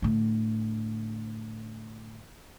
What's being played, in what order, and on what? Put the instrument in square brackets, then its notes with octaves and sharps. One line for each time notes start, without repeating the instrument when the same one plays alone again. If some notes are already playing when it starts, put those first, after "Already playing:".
[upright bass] A2 D3